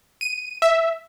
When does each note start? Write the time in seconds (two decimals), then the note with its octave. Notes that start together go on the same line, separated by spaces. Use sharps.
0.21 D#7
0.62 E5